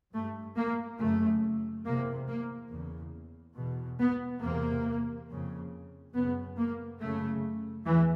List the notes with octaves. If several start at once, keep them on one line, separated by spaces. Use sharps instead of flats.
G2 A3
A#3
F#2 C#3 A3
E2 C3 A#3
A#3
E2 C#3
E2 B2
B3
E2 C3 A#3
F2 C#3
F#2 C#3 B3
A#3
F#2 C#3 A3
E2 E3